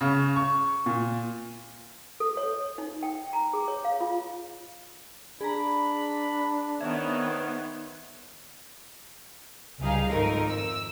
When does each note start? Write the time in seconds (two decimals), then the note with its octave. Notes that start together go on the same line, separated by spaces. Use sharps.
0.01 C#3
0.36 C#6
0.86 A#2
2.20 A4
2.37 C#5
2.78 D#4
3.03 G5
3.33 A#5
3.53 G#4
3.68 C#5
3.85 F5
4.00 F4
5.41 D4 G#4 A#5 B5
6.81 D#3 B3 C4 C#5 E5 G#6 E7
9.81 C#2 G3 D#4 G#4 F5
10.10 G#1 F2 A3 D#4 A#4
10.47 E6